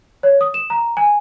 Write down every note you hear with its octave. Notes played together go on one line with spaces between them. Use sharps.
C#5
D#6
E7
A#5
G#5